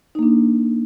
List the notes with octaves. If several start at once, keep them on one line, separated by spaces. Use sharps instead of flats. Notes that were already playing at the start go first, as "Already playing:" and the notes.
A#3 D4 D#4